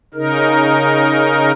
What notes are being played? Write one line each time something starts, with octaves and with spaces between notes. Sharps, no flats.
C#3 D#4 A#4